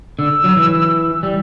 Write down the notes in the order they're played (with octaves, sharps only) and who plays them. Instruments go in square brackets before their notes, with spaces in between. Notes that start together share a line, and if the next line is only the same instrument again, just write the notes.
[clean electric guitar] D3 [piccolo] E6
[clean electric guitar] F#3
E3
G3